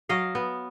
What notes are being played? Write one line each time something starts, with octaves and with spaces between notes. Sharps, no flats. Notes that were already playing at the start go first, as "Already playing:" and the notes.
F#3 D#5 F5
B3